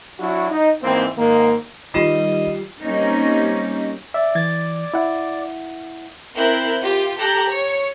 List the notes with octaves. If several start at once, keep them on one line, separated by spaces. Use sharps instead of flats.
F#3 D4 E4 F#4
D#4
G#2 E3 A#3 C4
G#2 D#3 A#3
D#3 G3 F4 G4 D#5 B5 C7 E7
G3 A#3 C4 C#4 D#4
D5 E5
E3 G#6 A6
E4 F#5
C4 E4 A#4 F#6 G6
F4 G4
G4 A4 A#5 F#6 G6
C#5